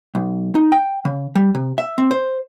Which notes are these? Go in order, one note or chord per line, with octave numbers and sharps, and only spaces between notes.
B1
D#4
G5
C#3
G3
C3
E5
C4
C5